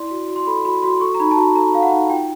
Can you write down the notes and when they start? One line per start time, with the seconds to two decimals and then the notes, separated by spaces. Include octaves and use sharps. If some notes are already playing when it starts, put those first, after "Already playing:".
Already playing: E4 D5 C6
0.11 F#4
0.28 F#4
0.36 C6
0.47 A4 B5
0.65 F#4 B5
0.83 F#4 C6
1.01 A4 C#6
1.14 A#5
1.20 D#4 B5
1.31 A5
1.37 F#4 A#5
1.56 A4 A#5
1.75 A4 F5
1.83 F#5
1.93 D#4
2.10 F4 G5